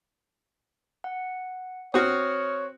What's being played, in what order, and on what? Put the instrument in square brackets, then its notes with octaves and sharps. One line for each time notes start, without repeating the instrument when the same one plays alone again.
[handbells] F#5
[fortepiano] C4 F#4 [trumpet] C#5 [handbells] D#6 F6